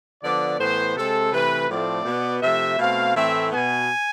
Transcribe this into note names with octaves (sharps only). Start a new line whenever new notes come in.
D3 F3 B3 D5
A2 E3 B3 C5
C3 G#3 C4 A4
C3 E3 A3 B4
A2 F3 A3 C4 D5
B2 B3
C3 F3 A3 E5
B2 A3 C4 F5
A2 E3 A3 C4 E5
B2 B3 G#5